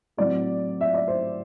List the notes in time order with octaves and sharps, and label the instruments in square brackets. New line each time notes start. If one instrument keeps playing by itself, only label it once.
[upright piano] A2 F#3 C4 D5
E5
D5
C5